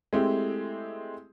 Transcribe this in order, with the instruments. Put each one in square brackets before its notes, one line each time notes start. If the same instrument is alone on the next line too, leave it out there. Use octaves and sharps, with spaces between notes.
[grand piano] G#3 A3 C4 E4 G4